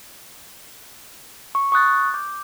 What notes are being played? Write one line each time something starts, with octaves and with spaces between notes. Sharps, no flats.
C#6
C#6 D#6 F#6 A6
D6 G6